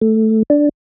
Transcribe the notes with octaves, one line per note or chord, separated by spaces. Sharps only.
A3
D4